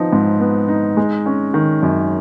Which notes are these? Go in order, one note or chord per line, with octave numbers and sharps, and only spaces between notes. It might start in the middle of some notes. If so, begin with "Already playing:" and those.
Already playing: F3 B3 D#4
G#2
B3
D#4
G#3
C#4
D#3
F#2